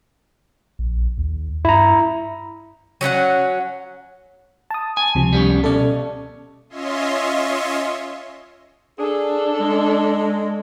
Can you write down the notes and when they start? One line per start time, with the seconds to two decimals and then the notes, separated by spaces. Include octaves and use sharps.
0.79 A#1
1.18 D#2
1.65 G2 E4 A#5
3.01 F#3 C#4 D#4 F#5
4.71 A5 D#6
4.97 G#5
5.15 C#2 C3 F3
5.33 G3 B3 C#4
5.64 B2 C#4 A4 D5
6.70 C#4 F4 C#5 D#5 E5 C6
8.98 D4 G#4 A4
9.60 G#3